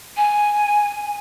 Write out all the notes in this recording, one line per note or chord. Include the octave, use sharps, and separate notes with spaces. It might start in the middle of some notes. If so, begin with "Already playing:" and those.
G#5